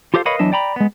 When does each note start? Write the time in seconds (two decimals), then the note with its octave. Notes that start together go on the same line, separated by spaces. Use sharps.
0.14 F4 G4 A4 C5 E5 F5
0.25 A#4 B4 C#5 D#5 F5 B5
0.39 E2 E3 F#3 D4 D#5 E5
0.52 D5 G5 A#5 B5
0.76 G#3 B3